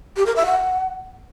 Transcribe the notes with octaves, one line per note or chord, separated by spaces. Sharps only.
G4
A#4
E5
F#5